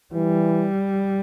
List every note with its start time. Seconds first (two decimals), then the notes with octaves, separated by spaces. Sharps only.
0.14 E3 G3